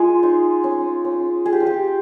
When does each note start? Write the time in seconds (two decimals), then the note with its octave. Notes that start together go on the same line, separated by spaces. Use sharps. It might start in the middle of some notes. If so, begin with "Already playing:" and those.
Already playing: G#3 F4 G#4
0.23 D#4
0.64 C#4
1.05 C#4
1.45 F4 G#4
1.52 G4
1.60 F4
1.66 G4